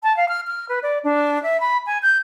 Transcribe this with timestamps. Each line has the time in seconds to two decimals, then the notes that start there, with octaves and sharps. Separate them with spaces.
0.03 A5
0.16 F5
0.28 F6
0.47 F6
0.68 B4
0.82 D5
1.03 D4
1.42 E5
1.60 B5
1.86 G#5
2.02 G6